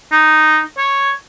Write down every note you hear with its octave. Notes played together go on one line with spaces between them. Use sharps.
D#4
C#5